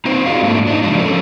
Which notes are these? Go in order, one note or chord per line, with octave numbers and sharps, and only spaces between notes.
C4 D#4 B4 C5
F4 F#4 G#4 D5 D#5 F5
G#2 A3 A#3 D4
D4 D#4
C#3 F3 F#3 G#3 D4
F3 C#4 A4 A#4